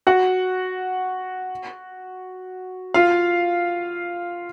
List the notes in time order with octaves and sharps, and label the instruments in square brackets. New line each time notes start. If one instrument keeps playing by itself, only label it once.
[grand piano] F#4 F#5
F4 F5